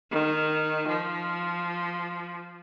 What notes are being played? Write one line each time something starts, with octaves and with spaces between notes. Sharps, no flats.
D#3
F3